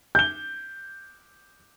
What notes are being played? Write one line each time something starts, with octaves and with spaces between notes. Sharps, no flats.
G6 G7